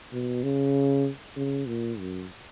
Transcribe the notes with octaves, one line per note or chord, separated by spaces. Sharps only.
B2
C#3
C#3
A#2
F#2